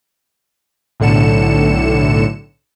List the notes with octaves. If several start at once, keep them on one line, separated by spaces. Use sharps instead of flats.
B1 A2 D3 C#7 E7